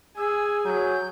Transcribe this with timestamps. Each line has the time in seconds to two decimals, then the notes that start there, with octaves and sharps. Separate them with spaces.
0.17 G#4 G#5 E6
0.65 F#3 G6